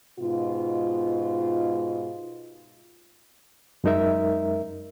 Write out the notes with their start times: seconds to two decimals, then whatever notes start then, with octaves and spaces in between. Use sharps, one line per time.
0.19 G#2 B2 F4
3.84 F#2 G#3 D#4 A#4 E5